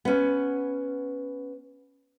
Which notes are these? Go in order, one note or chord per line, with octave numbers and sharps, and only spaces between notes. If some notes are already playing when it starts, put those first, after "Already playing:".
B3 C#4